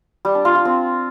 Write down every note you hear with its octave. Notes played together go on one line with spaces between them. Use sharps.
G3
D4
F4
F4
C4